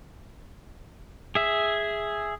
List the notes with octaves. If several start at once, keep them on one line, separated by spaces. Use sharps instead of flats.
G#4 E5